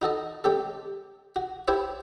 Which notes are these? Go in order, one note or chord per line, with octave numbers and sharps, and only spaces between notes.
D#4 F#4 A4 D#5
G#3 C#4 G4 A4
F#4
E4 G4 C5 C#5 E5